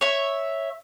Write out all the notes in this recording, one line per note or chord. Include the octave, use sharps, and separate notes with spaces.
C#5 E5